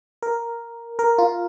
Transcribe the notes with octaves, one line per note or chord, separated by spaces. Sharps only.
A#4
A#4
F4